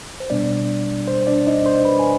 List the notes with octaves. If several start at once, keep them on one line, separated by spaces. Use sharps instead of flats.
C5
B2 G3 B3 D4 D5
C5
D4 D5
D#4 D#5
C5 C6
B4 B5
G#5